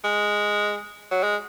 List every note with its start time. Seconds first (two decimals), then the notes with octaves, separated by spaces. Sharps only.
0.04 G#3
1.12 F#3
1.23 G#3